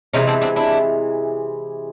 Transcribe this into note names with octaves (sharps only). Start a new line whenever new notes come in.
C3 E3 G#3 C#4 D#4
C4 D4
C4 D4
D4 E4